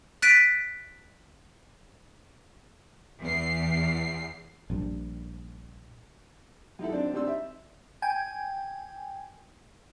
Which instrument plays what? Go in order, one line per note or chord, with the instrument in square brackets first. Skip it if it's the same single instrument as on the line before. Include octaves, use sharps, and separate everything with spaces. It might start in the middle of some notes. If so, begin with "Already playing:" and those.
[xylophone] F#6 A6 B6 D7 D#7
[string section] E2 C7
[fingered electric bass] A#1 G2
[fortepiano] F#2 D#4 E4 A4
F#3 C4 D4
G3 C4 D4 D#4 C6 E6
E5
[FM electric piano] G5 G#5